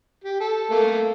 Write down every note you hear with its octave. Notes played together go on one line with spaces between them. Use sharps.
G4
A4
A3 A#3